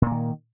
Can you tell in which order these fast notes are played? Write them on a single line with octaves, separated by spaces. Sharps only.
A#2 A#3 D#3